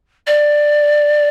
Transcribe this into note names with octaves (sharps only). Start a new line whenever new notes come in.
D5